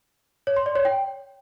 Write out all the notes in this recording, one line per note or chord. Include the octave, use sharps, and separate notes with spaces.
C#5
C6
D5
C#5
G5